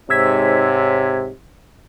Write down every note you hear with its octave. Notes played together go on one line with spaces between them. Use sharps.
G#2 C3 C#5 E6 G#6 B6